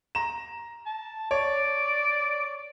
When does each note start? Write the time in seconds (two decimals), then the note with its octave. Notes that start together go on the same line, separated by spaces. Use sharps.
0.15 A#5 E7
0.86 A5
1.31 C#5 D5